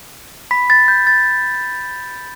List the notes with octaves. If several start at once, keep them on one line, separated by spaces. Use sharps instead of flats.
B5 B6
A6
G6
A6